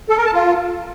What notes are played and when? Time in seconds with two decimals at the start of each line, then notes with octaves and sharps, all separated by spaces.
0.09 A4
0.17 A#4
0.25 A5
0.34 F4